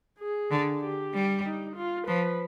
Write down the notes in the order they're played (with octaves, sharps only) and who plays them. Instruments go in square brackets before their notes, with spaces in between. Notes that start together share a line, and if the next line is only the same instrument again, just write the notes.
[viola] G#4
[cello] D3
[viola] G4
[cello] G3
[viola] D#4
F4
[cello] F3 [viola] B4